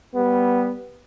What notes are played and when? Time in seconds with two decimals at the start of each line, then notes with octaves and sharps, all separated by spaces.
0.15 G3 B3